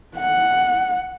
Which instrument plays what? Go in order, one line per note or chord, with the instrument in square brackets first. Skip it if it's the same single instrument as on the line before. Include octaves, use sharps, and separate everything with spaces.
[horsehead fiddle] F#5